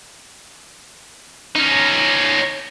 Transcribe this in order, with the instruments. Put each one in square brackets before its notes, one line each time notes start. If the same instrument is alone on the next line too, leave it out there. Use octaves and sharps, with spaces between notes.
[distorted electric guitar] C#4 D#4